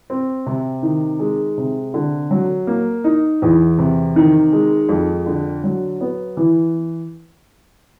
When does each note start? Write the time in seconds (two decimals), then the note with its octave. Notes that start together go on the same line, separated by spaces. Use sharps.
0.10 C4
0.46 C3
0.83 D#3
1.20 G#3
1.58 C3
1.94 D3
2.31 F#3
2.67 A#3
3.04 D#4
3.42 E2
3.78 C3
4.16 D#3
4.53 G#3
4.89 F2
5.26 D3
5.64 F#3
6.01 B3
6.37 E3